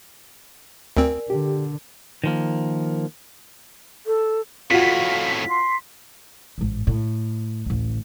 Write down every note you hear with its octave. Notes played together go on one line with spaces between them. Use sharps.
D2 C4 A#4 D5 G#5
D3 G4
D#3 F3 A#3
A4
F2 A2 F4 F#4 F5 B6
C6
A1 G#2
A2
A1 D2